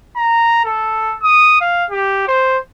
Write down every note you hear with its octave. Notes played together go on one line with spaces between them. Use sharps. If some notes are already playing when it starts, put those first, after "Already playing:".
A#5
A4
D#6
F5
G4
C5